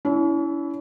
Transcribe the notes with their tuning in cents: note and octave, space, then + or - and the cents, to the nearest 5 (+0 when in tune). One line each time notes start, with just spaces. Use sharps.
C#4 +40 E4 -5